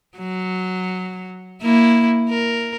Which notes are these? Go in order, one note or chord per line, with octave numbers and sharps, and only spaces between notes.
F#3
A#3 E4
A#4